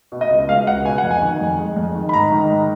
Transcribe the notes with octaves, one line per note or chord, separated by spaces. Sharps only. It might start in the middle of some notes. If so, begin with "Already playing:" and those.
B2
D#5
C#2
G#3 F5
C#2 F#5
B2 G#5
F#5
F2
G#5
D#3
F2
G#3
F2
D#3
B5
G#2 A#5
D#3
G#2